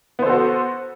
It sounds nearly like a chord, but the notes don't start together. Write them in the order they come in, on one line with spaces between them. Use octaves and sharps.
B3 C5 A4 F#4